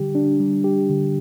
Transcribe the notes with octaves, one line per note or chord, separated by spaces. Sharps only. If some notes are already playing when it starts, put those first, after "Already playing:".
Already playing: D3 G3 G4
D4
G3
G4
D3